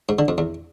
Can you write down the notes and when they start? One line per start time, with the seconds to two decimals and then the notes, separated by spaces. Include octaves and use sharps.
0.09 G#2
0.19 D3
0.28 F2
0.38 E2